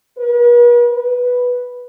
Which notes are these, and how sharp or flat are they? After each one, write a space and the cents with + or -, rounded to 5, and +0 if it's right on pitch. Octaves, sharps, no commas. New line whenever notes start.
B4 -45
B4 -5